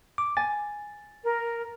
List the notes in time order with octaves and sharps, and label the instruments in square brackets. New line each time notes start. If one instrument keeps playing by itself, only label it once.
[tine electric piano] D6
[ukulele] G#5 [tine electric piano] A6
[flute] A#4